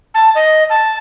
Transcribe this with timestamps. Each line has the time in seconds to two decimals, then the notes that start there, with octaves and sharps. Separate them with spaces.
0.14 A5
0.35 D#5
0.70 A5